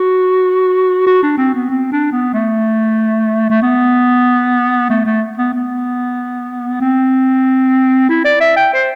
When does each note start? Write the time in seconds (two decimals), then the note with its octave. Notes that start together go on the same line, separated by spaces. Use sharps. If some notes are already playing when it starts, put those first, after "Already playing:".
Already playing: F#4
1.07 F#4
1.23 D4
1.37 C4
1.54 B3
1.70 C4
1.92 D4
2.12 B3
2.33 A3
3.50 A3
3.62 B3
4.90 A3
5.05 A3
5.37 B3
5.54 B3
6.81 C4
8.09 E4
8.25 D5
8.40 E5
8.56 G5
8.73 C5